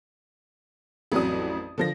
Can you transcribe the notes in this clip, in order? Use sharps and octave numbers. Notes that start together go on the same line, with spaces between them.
A1 F2 F#3 D5 D#6
D3 F3 A#6